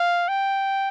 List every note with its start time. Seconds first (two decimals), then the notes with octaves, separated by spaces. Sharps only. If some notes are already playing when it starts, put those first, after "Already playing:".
Already playing: F5
0.29 G5